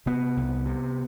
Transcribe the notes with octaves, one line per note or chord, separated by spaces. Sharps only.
C3 B3
C2
C3